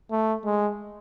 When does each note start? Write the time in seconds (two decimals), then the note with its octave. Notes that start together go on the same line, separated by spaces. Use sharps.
0.11 A3
0.45 G#3